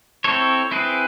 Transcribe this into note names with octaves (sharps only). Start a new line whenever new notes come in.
C4 E4 A4 C#5
C4 E4 G#4 B4